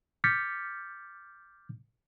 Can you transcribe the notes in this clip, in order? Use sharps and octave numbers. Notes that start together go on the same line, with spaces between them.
D6 F6 G6 A6 B6 C#7